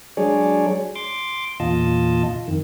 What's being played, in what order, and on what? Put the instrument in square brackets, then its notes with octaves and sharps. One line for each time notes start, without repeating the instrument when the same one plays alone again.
[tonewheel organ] F#3 G#3 D4 G#4 C#5 D5
C6 D6
E2 A#2 F4 D#5 A5
F2 D#3